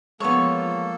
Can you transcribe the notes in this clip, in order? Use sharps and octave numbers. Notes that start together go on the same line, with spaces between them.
F3 G#3 A#3 B3 A4 C#5